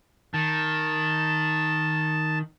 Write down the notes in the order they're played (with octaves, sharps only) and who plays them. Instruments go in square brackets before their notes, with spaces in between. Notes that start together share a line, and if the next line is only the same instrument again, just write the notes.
[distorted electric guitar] D#3 [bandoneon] A5